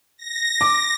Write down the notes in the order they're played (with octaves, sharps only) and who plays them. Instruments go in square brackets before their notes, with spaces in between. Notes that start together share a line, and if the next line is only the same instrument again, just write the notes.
[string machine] A#6
[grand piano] D6